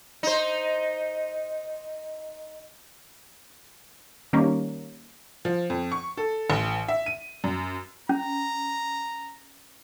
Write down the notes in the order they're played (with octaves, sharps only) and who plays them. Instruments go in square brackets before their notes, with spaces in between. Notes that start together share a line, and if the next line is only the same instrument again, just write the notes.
[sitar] D#4 C5
[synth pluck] D#3 G3 A#3 C#4
[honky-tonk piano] F3
F2
C#6
A4
A1
E5
D#7
F#2
[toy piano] C#4 [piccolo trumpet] A#5